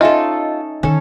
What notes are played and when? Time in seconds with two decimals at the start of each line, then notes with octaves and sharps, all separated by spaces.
0.01 C#4 D#4 F4 A4 D#5 E5 G#5
0.83 D#3 C#4 A4